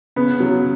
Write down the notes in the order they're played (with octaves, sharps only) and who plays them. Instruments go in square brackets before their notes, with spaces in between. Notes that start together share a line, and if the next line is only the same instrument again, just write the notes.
[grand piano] C#3 [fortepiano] B3
[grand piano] C#3 [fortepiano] F#3